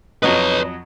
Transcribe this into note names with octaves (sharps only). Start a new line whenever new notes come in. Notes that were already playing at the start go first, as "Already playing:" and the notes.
F2 F#3 B4 C#5 D#5